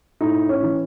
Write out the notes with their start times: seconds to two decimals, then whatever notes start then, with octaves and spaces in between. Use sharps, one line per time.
0.21 A2 D#4
0.49 C#4
0.63 E3